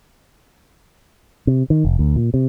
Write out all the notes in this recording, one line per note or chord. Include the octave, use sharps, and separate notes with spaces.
C3
D#3
F1
D2
A#2
C3